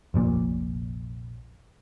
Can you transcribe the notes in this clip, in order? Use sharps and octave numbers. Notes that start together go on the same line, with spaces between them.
F1 A#1 A#2